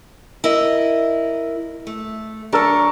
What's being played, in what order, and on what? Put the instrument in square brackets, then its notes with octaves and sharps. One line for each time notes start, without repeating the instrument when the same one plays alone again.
[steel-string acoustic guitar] E4 A#4 D#5
A3
[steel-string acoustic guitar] F#2 D4 [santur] A4 A#4 C#5